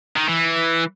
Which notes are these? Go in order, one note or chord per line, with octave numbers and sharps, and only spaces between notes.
D#3
E3